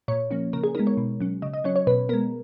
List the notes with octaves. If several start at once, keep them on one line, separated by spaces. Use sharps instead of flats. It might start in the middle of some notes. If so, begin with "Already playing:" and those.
A#2 C#5
F3 A#3 C#4
C#3 A#4
G#4
G#3 B3 D#4 A#4
C#5
B2
F#3 C#4
C#3 D#5
D#5
F#3 C#4 C#5
C#5
B2 B4
G#3 B3 A#4